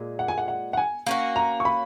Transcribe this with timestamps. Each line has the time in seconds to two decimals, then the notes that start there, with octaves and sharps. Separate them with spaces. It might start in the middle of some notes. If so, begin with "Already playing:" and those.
Already playing: A#2 G#3
0.19 F#5
0.28 G#5
0.38 F#5
0.48 F#5
0.73 F#5
0.77 G#5
1.06 A#3 C#4 F#4
1.36 A#5
1.60 C#6
1.65 B5